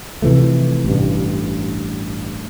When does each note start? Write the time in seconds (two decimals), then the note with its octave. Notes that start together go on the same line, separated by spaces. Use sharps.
0.22 C3 E3 F3 A3
0.84 A1 G2